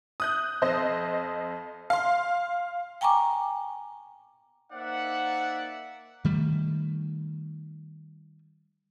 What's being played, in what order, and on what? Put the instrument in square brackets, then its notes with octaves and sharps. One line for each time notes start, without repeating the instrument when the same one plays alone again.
[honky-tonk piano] D#6 F#6 G6
F2 C5 D#5
F5 C6
[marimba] G5 G#5 A#5 C#6 D6
[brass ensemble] A#3 D#4 C5 D5 E5 F#5
[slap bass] D#3 G3 A3